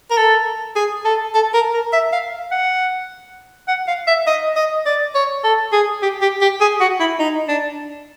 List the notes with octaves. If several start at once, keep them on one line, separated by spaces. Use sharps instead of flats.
A#4
A4
G#4
A4
A4
A#4
A#4
E5
F5
F#5
F#5
F5
E5
D#5
D#5
D5
C#5
A4
G#4
G4
G4
G4
G#4
F#4
E4
D#4
D4